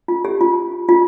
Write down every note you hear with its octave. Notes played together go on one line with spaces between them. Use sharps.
F4
G4
F4
F4